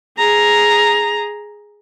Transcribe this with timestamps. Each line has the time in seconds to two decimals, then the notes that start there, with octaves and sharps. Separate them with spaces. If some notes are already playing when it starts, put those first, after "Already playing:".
0.18 G#4 A#5